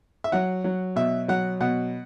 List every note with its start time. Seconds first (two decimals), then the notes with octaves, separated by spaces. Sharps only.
0.24 E5
0.32 F#3 F#5
0.64 F#3
0.96 B2 E5
1.28 F#3 F#5
1.60 B2 F#5